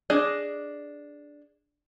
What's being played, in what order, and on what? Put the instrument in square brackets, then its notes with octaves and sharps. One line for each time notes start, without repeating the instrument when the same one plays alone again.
[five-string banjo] D4 G#4 D#5